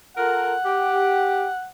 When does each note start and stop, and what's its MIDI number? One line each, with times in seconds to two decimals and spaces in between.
0.17 0.54 65
0.17 0.54 69
0.17 0.54 70
0.17 1.68 78
0.65 1.47 67